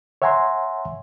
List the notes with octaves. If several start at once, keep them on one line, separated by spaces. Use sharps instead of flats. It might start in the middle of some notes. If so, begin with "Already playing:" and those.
C#5 E5 F#5 G#5 A#5 C6